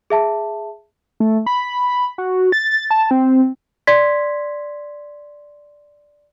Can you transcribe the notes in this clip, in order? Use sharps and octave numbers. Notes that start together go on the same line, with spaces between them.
G#4 E5 A5
A3
B5
F#4
A6
A5
C4
D5 C6 G#6 B6